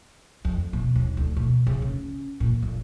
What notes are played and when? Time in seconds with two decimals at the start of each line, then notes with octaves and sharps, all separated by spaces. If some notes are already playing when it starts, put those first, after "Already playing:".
0.45 F2
0.73 B2
0.95 D#2
1.17 D2
1.37 B2
1.67 C#3
1.82 C#4
2.40 A#2
2.63 G1